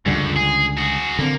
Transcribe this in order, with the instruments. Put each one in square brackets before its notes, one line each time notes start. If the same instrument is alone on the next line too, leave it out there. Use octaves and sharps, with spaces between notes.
[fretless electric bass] C#2 D3 G3 [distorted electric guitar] F#2
[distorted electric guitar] G#4
F#4 G#4
[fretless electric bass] D3 C4 [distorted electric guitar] A#3